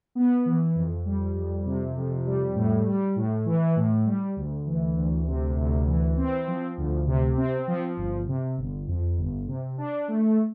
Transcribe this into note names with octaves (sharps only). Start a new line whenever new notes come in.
B3
E3
F2
G3
F2
C3
F2
G3
A2
G3
A2
E3
A2
G3
D2
E3
D2
C3
D2
E3
C4
F3
D2
C3
C4
F3
G1
C3
G1
F2
G1
C3
D4
A3